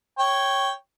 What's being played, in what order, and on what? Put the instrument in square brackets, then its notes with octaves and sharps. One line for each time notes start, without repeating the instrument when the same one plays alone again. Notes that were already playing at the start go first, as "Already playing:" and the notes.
[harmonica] C#5 G5